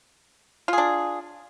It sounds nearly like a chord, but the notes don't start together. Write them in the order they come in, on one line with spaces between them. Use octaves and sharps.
F4 G#4 D4